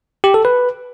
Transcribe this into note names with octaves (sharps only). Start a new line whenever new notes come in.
G4
A4
B4